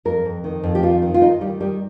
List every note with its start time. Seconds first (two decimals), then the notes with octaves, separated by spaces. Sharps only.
0.05 F2 A#4
0.25 F2
0.44 D#3
0.64 F2
0.75 G4
0.83 D#3 F4
1.02 D#3
1.14 F4
1.22 D#3 D#4
1.41 D#3 G3
1.60 D#3 G3